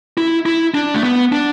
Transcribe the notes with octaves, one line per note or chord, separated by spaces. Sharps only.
E4
E4
D4
A3
B3
D4